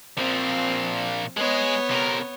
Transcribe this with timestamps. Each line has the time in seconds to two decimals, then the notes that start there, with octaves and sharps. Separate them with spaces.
0.18 A#2 F3 C4
1.37 G#3 B3 G#4 C#5
1.90 C3 A#4